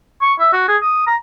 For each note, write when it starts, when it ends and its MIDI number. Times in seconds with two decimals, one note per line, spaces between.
0.21 0.34 85
0.39 0.51 76
0.52 0.66 66
0.68 0.77 68
0.82 1.02 87
1.07 1.15 82